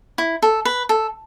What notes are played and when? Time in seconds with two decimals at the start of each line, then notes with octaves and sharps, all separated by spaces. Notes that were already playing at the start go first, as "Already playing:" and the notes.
0.18 E4
0.42 A4
0.65 B4
0.89 A4